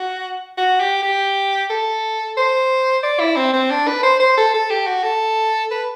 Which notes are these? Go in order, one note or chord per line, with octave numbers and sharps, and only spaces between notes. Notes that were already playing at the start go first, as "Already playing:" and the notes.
Already playing: F#4
F#4
G4
G4
A4
C5
D5
E4
C4
C4
D4
B4
C5
C5
A4
A4
G4
F#4
A4
B4